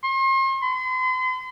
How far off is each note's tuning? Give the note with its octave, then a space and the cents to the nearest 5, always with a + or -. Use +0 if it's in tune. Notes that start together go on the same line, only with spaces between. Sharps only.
C6 +40
C6 -40